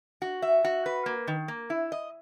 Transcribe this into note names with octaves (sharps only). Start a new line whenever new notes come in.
F#4
E5
F#4
B4
A#3
D#3
A#3
E4
D#5